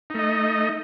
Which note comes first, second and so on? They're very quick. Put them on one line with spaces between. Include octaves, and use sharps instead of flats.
D#4 A3 D#5